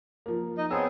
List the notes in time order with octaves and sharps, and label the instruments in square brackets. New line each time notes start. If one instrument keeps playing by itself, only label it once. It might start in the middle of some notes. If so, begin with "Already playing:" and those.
[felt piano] F3 A#3
[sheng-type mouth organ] D#4 D#5
[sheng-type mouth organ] B3 C4 G#4 [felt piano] C#5 E6